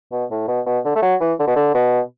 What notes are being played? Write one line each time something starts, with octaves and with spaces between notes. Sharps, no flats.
B2
A2
B2
B2
D3
A3
F#3
E3
D3
B2
D3
B2